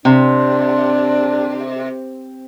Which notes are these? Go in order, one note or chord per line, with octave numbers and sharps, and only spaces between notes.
C3 C4 D4